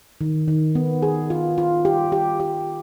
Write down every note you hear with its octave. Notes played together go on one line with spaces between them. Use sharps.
D#3
D#3
B3
G#4
F4
F4
G4
G4
G4